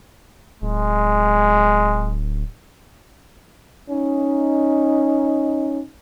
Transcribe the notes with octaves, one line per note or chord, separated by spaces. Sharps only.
D1 G#3
C#4 D#4